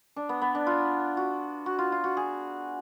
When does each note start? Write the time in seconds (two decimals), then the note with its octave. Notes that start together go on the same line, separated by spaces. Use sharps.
0.16 D4
0.29 B3
0.41 B3
0.55 D4
0.67 F4
1.17 F#4
1.66 F#4
1.79 F4
1.92 F4
2.04 F#4
2.17 G#4